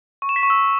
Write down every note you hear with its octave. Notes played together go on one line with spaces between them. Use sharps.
C#6
E7
B6
C#6
E6